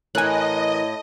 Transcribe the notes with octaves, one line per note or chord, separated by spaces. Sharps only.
A2 E3 A#4 D#5 G#5 F#6